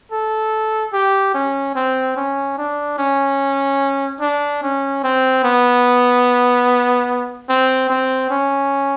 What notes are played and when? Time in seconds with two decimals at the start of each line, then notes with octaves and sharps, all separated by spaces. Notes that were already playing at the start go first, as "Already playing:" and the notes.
0.12 A4
0.93 G4
1.34 C#4
1.75 C4
2.16 C#4
2.58 D4
2.98 C#4
4.21 D4
4.62 C#4
5.04 C4
5.44 B3
7.49 C4
7.89 C4
8.30 C#4